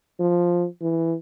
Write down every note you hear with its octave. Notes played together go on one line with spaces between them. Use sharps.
F3
E3